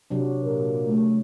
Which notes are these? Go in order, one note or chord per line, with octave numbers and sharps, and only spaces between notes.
C3 F#3 D4
A#2 A#4
A3